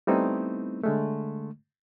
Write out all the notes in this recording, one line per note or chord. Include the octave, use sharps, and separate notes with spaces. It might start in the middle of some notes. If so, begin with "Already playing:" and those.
G3 A3 B3 C4 D#4 E4
D3 G#3 A3